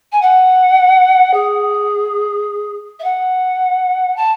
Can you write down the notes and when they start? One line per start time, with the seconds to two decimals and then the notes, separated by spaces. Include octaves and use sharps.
0.12 G#5
0.22 F#5
1.33 G#4
2.99 E5
3.04 F#5
4.16 A5